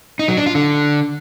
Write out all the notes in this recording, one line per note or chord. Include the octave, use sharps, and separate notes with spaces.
D#4
F#3
D4
F4
D3